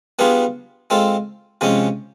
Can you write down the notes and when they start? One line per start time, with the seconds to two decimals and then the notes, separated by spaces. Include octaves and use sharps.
0.19 G3 B3 D4 F4 G#4
0.90 G#3 C4 F4 A4
1.61 C3 F3 G#3 C#4